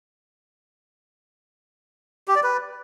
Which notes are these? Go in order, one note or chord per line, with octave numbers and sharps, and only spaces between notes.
G4
D5
B4